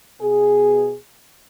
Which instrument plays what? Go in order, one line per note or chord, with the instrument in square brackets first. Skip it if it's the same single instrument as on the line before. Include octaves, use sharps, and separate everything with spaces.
[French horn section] B2 G#4